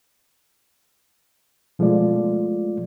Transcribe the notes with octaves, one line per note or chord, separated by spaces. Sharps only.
B2 F3 G#3 A3 F4 D5